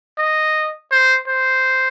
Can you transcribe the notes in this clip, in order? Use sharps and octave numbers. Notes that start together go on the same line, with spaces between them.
D#5
C5
C5